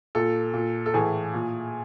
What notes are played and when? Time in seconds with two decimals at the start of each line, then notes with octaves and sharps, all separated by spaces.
0.15 A#2 A4
0.54 A#2
0.86 A4
0.94 A2 E3 G#4
1.34 A#2